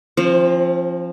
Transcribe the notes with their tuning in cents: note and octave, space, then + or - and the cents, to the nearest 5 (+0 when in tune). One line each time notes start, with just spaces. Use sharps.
F3 -5 C4 +35